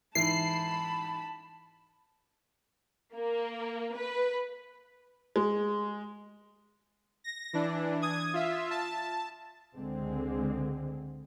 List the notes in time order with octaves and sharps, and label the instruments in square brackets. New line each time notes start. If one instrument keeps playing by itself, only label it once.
[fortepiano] G#2 E3 [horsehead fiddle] A5 B5 [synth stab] C7
[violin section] A#3
B4
[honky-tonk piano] G#3
[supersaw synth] A#6
E3 D4
D#6 G#6
F4 E5
A5
[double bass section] C#2 D3 G#3 C4